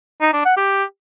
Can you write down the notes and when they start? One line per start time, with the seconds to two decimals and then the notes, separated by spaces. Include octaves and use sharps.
0.21 D#4
0.33 D4
0.45 F#5
0.57 G4